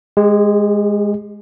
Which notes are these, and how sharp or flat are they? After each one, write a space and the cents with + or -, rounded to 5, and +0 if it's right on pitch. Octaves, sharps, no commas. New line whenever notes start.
G#3 -5 G4 +40